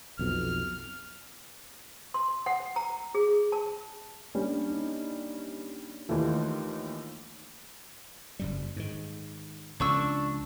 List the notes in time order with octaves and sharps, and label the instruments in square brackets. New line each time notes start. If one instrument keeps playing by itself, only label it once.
[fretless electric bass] B1 F2 B2 [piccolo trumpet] F6
[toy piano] C6
F#5
A#5
G#4
A5
[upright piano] G3 C#4 [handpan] A#3 D4
[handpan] D#4
[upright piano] D#2 E3 A3 [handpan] D#4 F4
[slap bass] F#1 F#2 G3
G#2 D#3
[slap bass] C#2 F3 C#4 [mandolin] D4 C#6 E6